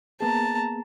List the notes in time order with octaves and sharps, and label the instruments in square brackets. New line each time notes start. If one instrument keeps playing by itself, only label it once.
[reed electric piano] A#3 B3 G#4 [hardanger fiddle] A5 A#5